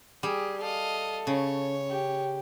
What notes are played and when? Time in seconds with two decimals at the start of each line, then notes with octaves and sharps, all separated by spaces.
0.23 G3 G4 G#4
0.61 A4 D#5 F5
1.27 C#3 C#5
1.89 G4